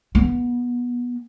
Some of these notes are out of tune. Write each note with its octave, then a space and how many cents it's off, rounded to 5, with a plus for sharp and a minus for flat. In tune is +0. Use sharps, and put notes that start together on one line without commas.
B3 -20